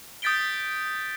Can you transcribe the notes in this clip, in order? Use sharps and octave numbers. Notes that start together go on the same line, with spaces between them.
D#6 G6 A6 B6 D7 G7